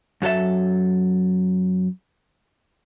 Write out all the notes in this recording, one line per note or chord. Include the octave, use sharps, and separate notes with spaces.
F#2 F#3 A4 E5